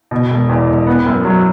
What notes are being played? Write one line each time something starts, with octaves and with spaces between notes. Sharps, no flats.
B2
E1
E2
E1
B3
F#2
F#3